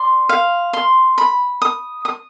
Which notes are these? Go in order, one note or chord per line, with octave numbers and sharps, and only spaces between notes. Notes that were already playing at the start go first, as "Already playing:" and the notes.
Already playing: D5 C6
F5
C6
B5
D#6
D#6